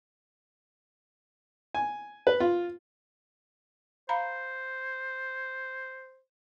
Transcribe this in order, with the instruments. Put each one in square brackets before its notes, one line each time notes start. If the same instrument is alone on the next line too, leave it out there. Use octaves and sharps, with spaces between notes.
[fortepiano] G#5
B4
F4
[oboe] C5 [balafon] F5 A#5 B5